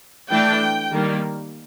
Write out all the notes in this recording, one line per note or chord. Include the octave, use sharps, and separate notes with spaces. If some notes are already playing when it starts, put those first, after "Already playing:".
E3 A3 D4 G5
D#3 G3 A#3